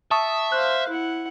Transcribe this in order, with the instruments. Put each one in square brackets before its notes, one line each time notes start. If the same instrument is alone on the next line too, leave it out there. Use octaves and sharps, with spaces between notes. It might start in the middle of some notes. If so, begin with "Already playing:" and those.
[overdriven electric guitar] E5 [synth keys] A5 C#6 D#6
[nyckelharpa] C5 F5 [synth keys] F#6
[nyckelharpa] E4 F#5